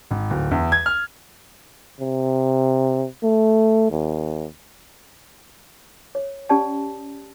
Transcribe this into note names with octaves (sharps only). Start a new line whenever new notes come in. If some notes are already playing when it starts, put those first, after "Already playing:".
G#1
D1
E2
G#6
F6
C3
A3
D#2
C#5
C#4 G4 D5 A5